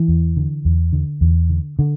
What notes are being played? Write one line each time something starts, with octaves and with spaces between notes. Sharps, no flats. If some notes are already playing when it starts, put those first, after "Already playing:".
Already playing: E3
E2
D3
E2
D3
E2
D3
D3